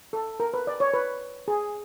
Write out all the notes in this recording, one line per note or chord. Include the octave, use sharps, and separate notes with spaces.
A4
A#4
B4
D5
C#5
B4
G#4